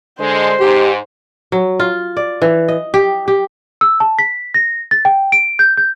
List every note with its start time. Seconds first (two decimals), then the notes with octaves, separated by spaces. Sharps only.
0.20 D3 G#3 C5
0.60 G#2 G4
1.52 F#3
1.80 F4
2.17 D5
2.42 E3
2.68 D#5
2.94 G4
3.28 G4
3.81 E6
4.00 A5
4.19 B6
4.54 A#6
4.91 A6
5.05 G5
5.32 D7
5.59 G6
5.77 G6